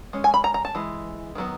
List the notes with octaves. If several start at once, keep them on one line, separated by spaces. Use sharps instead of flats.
G#3 C#4
G#5
B5
A#5
A#5
A5
E3 G#3
D#3 F#3 B3